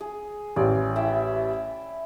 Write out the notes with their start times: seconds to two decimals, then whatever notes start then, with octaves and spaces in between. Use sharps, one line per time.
0.01 G#4
0.56 A1 D5
0.96 E4 E5 G5